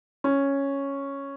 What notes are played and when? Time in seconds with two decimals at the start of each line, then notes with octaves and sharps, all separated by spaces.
0.24 C#4